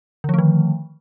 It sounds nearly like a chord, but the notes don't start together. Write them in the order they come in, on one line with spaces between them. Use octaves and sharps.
D3 F3 A3 D#3